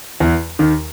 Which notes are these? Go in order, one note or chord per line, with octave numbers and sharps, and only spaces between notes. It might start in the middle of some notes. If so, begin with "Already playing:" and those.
E2 E3
D#2 D#3